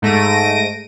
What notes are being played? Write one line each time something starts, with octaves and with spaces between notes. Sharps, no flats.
G#2 A3 A#6 D7 D#7